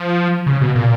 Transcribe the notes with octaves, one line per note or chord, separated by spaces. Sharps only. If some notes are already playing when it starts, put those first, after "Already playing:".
Already playing: F3
C#3
B2
A#2